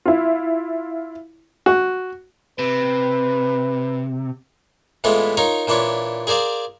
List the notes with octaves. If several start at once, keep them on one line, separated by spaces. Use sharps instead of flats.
E4 F4
F#4
C3 B4
A2 E3 G#3 A3 B3 F4
D#4 F4 A#4 C#5
A#2 E3 D4 F4 C#5
G#4 A#4 C5 D5 F5